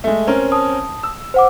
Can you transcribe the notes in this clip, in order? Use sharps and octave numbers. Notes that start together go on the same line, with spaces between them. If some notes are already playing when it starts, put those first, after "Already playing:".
G#3 A3
C4 C#4 A#4
A5 D#6
E6
C5 F#5 D6